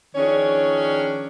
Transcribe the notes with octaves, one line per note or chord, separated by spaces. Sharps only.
D#3 F3 C#4 D4 G#4 C#5